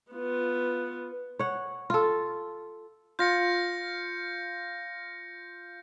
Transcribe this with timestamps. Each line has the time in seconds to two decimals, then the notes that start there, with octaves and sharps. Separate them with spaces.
0.12 B3 F4
1.39 C#5 F#5
1.90 F4 A4
3.19 F4 G6 A#6 C#7